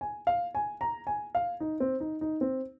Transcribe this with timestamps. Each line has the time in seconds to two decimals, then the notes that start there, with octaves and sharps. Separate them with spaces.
0.01 G#5
0.27 F5
0.55 G#5
0.81 A#5
1.07 G#5
1.35 F5
1.60 D#4
1.80 C4
2.00 D#4
2.21 D#4
2.41 C4